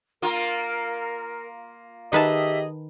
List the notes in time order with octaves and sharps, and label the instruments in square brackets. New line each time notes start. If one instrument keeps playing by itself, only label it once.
[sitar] A#3 F4 [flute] A#4
[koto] D#3 B4 A5 [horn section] G4 G#4 D#5 [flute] E5